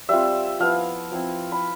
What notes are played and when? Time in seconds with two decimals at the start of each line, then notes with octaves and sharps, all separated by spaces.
0.09 G3 C4 F4 E5
0.60 F3 B3 E4 F5
1.12 F3 C4 E4
1.52 B5